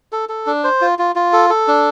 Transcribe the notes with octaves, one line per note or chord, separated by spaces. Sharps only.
A4
A4
D4
C5
F4
F4
F4
A4
A4
D4